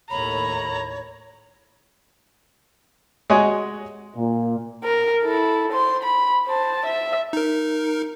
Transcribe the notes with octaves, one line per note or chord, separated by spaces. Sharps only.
D#2 A2 C#5 A#5 B5
G#3 F#4 C#5 D#5 G#5
A#2
A#4
E4 A4
C5 C6
B5
C5 A5
E5
D#4 A#4